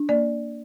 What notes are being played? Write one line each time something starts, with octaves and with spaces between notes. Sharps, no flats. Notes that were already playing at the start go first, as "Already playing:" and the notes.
Already playing: D4
A#3 D5